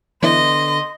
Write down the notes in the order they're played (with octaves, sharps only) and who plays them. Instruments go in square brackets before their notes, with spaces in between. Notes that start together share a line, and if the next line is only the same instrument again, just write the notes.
[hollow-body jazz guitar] D3 B3 [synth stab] E3 E4 [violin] D#5 [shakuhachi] C6